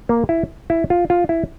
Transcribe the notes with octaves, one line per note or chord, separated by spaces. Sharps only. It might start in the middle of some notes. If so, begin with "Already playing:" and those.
A#3
E4
E4
F4
F4
E4